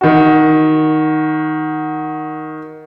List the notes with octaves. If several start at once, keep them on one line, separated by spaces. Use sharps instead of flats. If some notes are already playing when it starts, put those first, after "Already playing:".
D#3 F#4